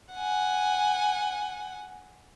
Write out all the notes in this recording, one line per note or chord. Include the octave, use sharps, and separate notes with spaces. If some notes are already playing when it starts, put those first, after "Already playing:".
F#5 G#5